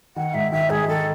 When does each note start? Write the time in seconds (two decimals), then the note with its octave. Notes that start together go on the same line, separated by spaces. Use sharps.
0.16 D#3 F#5
0.34 G#2 E5
0.52 D#3 E5
0.70 G#2 G#4
0.88 D#3 A4